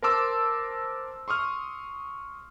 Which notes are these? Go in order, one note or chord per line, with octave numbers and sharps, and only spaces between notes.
A#4 C5 A5 C6 D6 E6
C6 C#6 D#6 F6